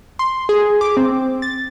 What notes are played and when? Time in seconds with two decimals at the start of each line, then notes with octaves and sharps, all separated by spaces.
0.19 C6
0.49 G#4
0.81 D6
0.97 C4
1.42 A6